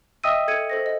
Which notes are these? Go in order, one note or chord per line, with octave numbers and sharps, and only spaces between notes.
D#5 E5 G5 D#6 E6 D#7
A4 G#6 C#7 D#7
A4 C5 A#6
D#5